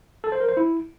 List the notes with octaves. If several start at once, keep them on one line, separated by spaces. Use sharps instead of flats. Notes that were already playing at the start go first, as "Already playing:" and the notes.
A4
C5
A#4
C5
E4